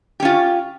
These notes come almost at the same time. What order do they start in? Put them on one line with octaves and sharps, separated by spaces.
G4 C#4 F4